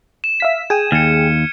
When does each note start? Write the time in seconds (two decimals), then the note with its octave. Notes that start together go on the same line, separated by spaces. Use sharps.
0.24 E7
0.40 E5 F5 B6
0.70 G#4 G5 G#6 D#7
0.92 D#2 F6 C#7